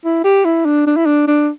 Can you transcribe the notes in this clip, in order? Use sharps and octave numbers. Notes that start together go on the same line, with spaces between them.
E4
G4
E4
D4
D4
E4
D4
D4